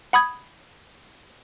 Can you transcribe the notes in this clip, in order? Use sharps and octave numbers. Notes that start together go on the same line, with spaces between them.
F#5 B5 D#6 G#6